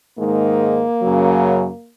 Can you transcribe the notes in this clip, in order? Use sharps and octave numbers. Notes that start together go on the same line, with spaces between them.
G#2 D#3 G#3 A#3
F#2 C#3 F#3